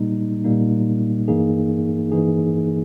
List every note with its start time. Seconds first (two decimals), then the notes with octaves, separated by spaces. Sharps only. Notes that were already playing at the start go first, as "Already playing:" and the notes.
Already playing: A#2 G3 A#3 D#4
0.44 A#2 G3 A#3 D#4
1.28 G2 E3 A#3 D#4 G#4
2.12 G2 E3 A#3 D#4 G#4